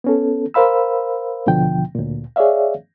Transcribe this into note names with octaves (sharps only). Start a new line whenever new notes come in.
B3 C#4 A4
A#4 C5 F5 B5 E6
D#2 B2 D3 F3 G5
D2 A#2
G#4 C#5 D5 E5 F5